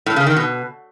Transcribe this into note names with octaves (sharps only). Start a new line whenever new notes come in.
A2
C#3
D#3
B2